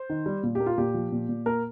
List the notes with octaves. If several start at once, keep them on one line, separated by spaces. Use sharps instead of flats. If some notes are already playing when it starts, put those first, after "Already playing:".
Already playing: C5
D#3
G3
A#2
G4
A#3
F4
A#2 G4
F3
A#2
A#2
A#3 A#4